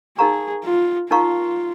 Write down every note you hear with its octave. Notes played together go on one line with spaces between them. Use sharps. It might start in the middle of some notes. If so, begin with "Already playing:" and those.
D#4 G#4 A#4 F5 A#5 C#6
F4
D#4 F4 A#4 F5 A#5 C#6